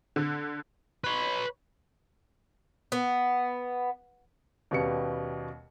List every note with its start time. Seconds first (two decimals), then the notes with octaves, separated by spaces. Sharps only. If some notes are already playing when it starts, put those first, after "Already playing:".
0.16 D3
1.04 B4 C#5
2.92 B3
4.71 D#2 B2 G3 B3 C#4 C#7